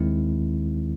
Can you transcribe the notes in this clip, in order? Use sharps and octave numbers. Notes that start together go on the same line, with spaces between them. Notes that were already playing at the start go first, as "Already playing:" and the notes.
Already playing: D#2 D#3 G#3 C4 E4